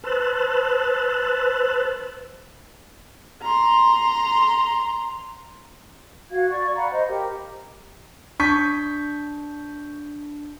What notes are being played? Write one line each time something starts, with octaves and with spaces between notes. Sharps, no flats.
B4 C5 A5 E6 F#6
A#5 C6
F#4 F5 G#6
D5 C#6
F5 F#5 A#5 B5
C5 D#5
G4 A#4
D4 C#6 G6 B6